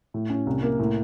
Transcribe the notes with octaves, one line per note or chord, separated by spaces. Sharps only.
A2
C#4
C2
A#3
A2